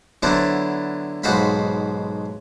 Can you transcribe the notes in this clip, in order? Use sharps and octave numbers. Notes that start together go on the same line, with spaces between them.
D3 F#3 B3 D4 E4 C5
B1 G#2 F#4 C5 F5 B5